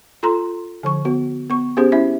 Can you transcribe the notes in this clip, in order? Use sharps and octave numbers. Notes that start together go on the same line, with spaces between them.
F4 A4 A#5 C6
D3 F3 C#6
B3 F#4
B3 C#6
B3 C#4 G4 G#4 C5
C#4 E4 E5